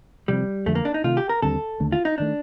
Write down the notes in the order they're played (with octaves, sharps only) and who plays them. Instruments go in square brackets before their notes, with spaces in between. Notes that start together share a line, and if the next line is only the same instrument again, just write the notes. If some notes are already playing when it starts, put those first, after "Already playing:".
[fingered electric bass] C3 F3 C4 [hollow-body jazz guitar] G3
[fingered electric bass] F2 D3 F3 [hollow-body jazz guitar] A3
[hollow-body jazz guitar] A#3
D4
D#4
[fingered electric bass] C3 D#3 A3 [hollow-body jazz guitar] F4
[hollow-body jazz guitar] G4
A#4
[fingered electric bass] D#2 D3 G3 C4 [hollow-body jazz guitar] A4
[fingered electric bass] D#2 D3 A3
[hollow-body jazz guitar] F4
D#4
[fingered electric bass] D#3 A3 [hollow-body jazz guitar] D4